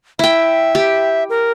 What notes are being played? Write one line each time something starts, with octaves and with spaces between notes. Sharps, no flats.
E4 E5 G5
G4
A#4